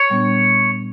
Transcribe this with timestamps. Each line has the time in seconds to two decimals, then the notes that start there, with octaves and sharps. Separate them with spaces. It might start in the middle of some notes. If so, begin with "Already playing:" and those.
Already playing: C#5
0.10 A#2 G3 B3 D4